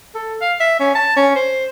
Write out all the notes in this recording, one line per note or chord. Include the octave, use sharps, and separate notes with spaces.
A4
F5
E5
C#4
A5
C#4
C5